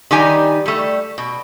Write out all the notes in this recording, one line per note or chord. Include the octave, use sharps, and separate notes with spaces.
D#3 G3 D#4 G4 G#5
G3 A3
B2